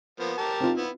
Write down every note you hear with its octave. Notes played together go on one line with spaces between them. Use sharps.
F3 A#3 B3
G4 A#4 A5
C4 D#4 F4
B3 E4